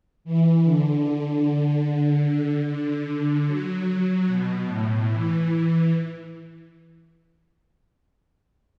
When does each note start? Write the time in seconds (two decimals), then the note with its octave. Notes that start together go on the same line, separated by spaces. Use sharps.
0.24 E3
0.64 D3
2.65 D3
3.46 F#3
4.27 B2
4.67 A2
5.08 E3